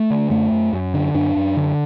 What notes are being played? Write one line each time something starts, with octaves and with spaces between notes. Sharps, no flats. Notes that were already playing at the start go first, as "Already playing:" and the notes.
Already playing: A3
D3
F#2 A3
F#2
F#2
D3
F#2 D4
F#2
D3